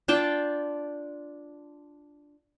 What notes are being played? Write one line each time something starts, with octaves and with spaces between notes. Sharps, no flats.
D4 F4 G5 A5